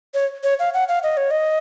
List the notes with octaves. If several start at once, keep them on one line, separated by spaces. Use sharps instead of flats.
C#5
C#5
F5
F#5
F5
D#5
C#5
D#5